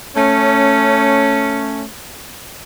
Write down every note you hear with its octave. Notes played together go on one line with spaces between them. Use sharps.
A3 C#4